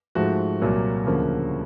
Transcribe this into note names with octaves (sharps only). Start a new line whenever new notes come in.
G#2 F3 A3 F#4
C2 A#2 F#3 A#3
D2 C#3 F3 A#3